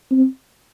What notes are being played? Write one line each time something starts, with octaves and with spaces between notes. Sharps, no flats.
C4